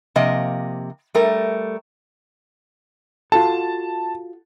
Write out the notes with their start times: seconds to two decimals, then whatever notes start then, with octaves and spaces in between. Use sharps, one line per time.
0.16 C3 F3 A#3 D#5
1.14 G3 A3 A#4
3.32 F4 F#4 A4 A5